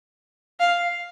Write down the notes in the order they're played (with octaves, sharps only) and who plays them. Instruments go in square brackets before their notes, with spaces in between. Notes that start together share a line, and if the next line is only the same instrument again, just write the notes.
[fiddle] F5